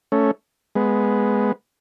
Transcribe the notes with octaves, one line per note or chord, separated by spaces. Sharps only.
A3 C#4
G#3 B3